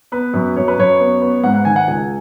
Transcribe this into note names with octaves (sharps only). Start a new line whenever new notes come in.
B3 B4
F#2
F#2 C#5
B4
F#2 C#5
B3
B3
G#2 F#5
F#5
D#3 G#5
F#5
C#2 G#5